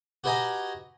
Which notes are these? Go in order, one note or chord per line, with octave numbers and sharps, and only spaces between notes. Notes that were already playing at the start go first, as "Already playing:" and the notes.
F#4 G4 B4 D#5 G#5 A#5